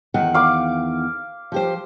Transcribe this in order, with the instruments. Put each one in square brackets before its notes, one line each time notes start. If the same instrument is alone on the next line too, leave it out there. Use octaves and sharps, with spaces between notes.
[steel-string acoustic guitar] E2 D#3 F#5
[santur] F5 D6
[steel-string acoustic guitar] F3 G4 C5